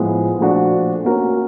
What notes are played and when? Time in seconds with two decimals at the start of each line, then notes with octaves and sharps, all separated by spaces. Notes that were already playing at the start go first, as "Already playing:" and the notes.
Already playing: A2 F3 G#3 B3
0.39 A#2 F3 A3 D4 F#4
1.05 A#3 C#4 F#4 A#4